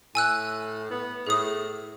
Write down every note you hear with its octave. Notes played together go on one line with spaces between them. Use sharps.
A2 G#5 E6 F#6
B3
A2 G#4 D#6